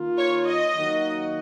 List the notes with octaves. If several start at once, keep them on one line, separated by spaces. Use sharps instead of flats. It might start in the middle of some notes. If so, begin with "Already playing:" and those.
Already playing: D#3 A#3 F4
C#5
D#5
D#3 F#3 A#3 D#4 F#4